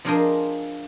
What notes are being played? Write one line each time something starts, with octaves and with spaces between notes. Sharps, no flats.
F3 D4 G#4 A#4 C5 D#5